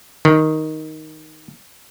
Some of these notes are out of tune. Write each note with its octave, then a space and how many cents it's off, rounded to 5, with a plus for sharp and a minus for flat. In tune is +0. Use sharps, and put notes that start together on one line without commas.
D#3 +5